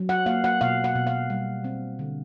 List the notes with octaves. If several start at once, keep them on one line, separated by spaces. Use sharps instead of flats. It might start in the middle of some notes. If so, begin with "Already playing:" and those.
Already playing: F#3
F#5
A#3 F5
F#5
B2 F5
F#5
B2
F5
G3
C4
D3